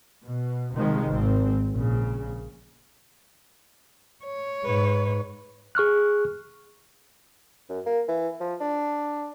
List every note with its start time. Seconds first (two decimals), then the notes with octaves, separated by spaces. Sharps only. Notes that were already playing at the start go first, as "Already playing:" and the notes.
0.23 B2
0.74 C2 C3 D#3 F3 G#3
1.07 G#1 C4
1.70 A#1 A#2 C#3
4.24 C#5
4.64 G#2 B4
5.75 G#4 C#6 F6 F#6
7.69 F#2
7.86 A#3
8.08 E3
8.40 F3
8.60 D4